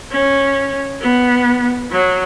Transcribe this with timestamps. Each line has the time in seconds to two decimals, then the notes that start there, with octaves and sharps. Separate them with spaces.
0.11 C#4
1.01 B3
1.92 F#3